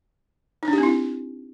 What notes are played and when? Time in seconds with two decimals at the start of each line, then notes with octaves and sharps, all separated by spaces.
0.63 D#4
0.68 D4
0.73 G4
0.78 C4
0.83 E4